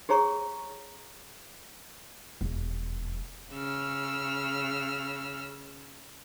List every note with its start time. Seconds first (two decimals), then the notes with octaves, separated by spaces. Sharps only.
0.09 G4 G#4 C#5 A#5 C#6
2.41 E1 F2
3.53 C#3 E6 F6